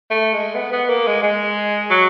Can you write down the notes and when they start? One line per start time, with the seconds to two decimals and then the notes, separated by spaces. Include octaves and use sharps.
0.11 A3
0.33 G#3
0.55 B3
0.72 B3
0.89 A#3
1.07 G#3
1.23 G#3
1.90 F#3